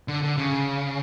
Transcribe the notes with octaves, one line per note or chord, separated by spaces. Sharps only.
D3
D3
C#3